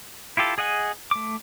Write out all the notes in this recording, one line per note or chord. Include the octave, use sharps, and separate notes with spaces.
E4 F4 G4 A4
G#4 D#5 F#5 G#5
A3 D6